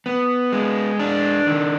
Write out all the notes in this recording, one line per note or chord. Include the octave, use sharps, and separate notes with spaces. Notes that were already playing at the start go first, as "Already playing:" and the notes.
B3
G#3
D4
D#3